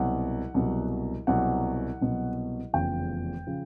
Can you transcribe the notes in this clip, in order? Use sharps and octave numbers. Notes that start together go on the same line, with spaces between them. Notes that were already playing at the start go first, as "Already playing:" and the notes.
Already playing: C2 B2 F#3 F#5
C2 B2 F#3
C2 B2 F#3 F#5
C2 B2 F#3
F1 E2 C#3 F3 G5
C#3 F3